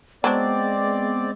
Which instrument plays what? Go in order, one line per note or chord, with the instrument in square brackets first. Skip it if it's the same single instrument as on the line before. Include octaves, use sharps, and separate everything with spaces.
[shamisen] F#3 D4 [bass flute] G#3 [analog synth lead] B3 [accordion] C4 D5